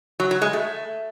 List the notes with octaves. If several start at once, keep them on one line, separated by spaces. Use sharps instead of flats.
F#3
F#3
G#3
A3